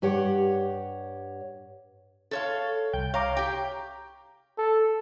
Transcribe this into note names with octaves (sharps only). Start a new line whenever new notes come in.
G2 G4 C#5 F#5
A4 C#5 F5
C2 G5 G6
C#5 F5 A#5 D6
G4 G5
A4